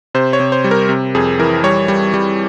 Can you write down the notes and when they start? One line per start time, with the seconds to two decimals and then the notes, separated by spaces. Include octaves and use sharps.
0.14 C3 C5
0.33 C#5
0.40 C3
0.52 C5
0.64 G3
0.71 A#4
0.89 C3
1.15 F2 G#4
1.39 E3 A#4
1.64 G3 C#5
1.88 G3
2.14 G3